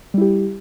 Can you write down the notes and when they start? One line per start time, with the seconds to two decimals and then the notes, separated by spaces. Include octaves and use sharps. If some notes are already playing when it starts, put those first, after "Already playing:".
0.14 G3
0.18 E4
0.21 G4